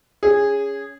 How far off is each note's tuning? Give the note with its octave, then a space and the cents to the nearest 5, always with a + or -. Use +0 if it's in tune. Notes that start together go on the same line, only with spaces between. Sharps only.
C#4 +15 G#4 -15